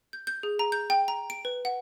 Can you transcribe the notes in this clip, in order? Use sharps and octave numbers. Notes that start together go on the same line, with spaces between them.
G6
G6
G#4
A#5
G6
G5
A#5
D7
B4
F#5